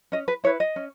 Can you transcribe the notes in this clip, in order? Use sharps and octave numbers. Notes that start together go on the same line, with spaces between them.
C#4 D#5
B4
E4 B4 C#5
D#5
C#4